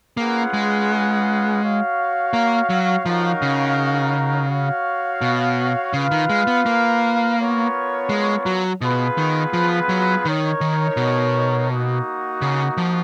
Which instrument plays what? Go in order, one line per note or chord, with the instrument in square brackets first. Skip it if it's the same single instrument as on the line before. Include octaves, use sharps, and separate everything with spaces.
[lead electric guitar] A#3 [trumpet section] C#4 F4 G#4 B4 F#5
[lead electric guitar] G#3
[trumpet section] F#4 C#5 F5
[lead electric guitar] A#3
F#3
[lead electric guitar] F3 [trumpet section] D#4 F#4 A#4 C#5 F5
[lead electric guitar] C#3
[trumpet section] F#4 C#5 F5
[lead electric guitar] B2
[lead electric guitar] C#3 [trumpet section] F4 B4 F5
[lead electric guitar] D#3
G#3
B3
A#3
[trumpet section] B3 F4 A#4 C#5
[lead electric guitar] G#3
F#3
[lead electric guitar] B2 [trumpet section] B3 F4 G#4 B4
[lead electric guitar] D#3
F3
F#3
[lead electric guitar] D#3 [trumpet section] D#4 A#4 C#5
[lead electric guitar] D#3
B2
[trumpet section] A#3 D#4 F#4
[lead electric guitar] C#3
F3